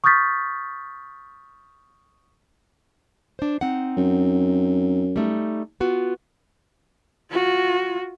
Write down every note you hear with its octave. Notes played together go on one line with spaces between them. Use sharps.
C#6 D#6 F6 G6 A6 B6
D4 C5
C4 D#4 F#5
F#2
G3 A3 D#4
B3 F4 F#4
F4 F#4